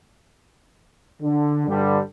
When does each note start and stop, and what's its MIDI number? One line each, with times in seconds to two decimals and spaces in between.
1.22 1.64 50
1.68 2.00 43
1.68 2.00 50
1.68 2.00 55